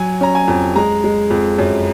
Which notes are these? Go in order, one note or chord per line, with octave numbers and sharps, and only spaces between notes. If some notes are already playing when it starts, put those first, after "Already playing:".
Already playing: F#3 G#5
C#4 A#5
G#5
F2
G#3 A#5
G#3
F2
F#2